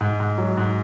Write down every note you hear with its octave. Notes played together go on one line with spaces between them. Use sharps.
G#2
G#2
F#3
G#2